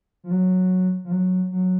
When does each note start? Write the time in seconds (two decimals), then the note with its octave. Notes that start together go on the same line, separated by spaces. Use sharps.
0.24 F3
0.31 F#3
1.04 F3
1.11 F#3
1.51 F#3